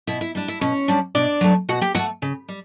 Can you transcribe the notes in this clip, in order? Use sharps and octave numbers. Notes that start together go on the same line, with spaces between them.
B2 E4
E4
G3 D4
E4
B2 C#4 C#5
G3 D4
B2 D4 D5
F#3 A3
B2 F#4 F#5
G4 G5
F#3 A3 F#4 F#5
C#3
G3